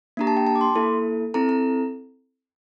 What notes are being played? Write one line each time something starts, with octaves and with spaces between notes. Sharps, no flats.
A#3 D4 G4 A#5
A5
G5
A5
D6
C6
A#3 E4 A4
C4 E4 A4 A#5
A#5